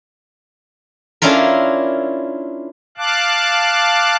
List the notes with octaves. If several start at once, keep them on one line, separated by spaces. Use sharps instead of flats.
C#4 D4 E4 F4 A#4
F5 A5 D6 F#6